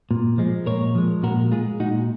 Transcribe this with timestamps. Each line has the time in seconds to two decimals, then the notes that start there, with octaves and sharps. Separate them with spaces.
0.11 A#2
0.38 F3 G#3
0.66 A#2 A#4 C#5
0.95 F3 G#3
1.23 A#2 F#4 A#4
1.51 G#3 F4 G#4
1.80 A#2 D#4 F#4